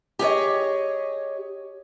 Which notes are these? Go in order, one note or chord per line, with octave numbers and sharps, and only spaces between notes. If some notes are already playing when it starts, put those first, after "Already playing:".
G4 G#4 C#5 D#5